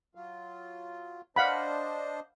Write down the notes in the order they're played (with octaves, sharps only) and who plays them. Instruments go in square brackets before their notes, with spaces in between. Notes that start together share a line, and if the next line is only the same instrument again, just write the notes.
[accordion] F#3 F4
[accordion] D4 C5 D#5 [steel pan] F5 F#5 B5